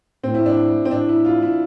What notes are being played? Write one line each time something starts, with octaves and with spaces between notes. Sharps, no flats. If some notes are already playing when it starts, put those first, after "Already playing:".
A2 C4
E4
D4
C4
A2 D4
E4
F4
E4